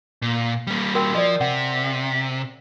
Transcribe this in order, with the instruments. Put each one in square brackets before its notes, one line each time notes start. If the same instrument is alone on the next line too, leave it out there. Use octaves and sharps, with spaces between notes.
[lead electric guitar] A#2
G3 A#3
[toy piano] F#4 A#4 G5
[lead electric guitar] F3 [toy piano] D5 D#5
[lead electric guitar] C3 [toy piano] F#5